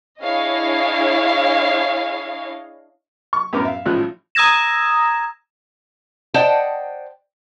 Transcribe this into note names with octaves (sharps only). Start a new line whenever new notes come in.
D4 E4 G#4 C#5 D#5 F5
C#6
F#2 A2 B3 C#4 A#4 D6
E5 F5
G#1 A2 F3 C#4 F4 F#6
A#5 D#6 E6 G#6 A#6 E7
C5 D5 D#5 F#5 G5 A5